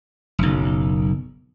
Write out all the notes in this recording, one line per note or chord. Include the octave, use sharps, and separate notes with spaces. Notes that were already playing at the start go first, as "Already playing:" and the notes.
F#1 B1